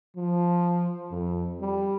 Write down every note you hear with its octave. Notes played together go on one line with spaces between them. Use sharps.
F3
F2
G3